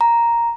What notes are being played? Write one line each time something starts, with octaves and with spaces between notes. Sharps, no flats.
A#5